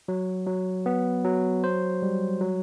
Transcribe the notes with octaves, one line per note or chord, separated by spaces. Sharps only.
F#3
F#3
B3
F#3
C5
G3
F#3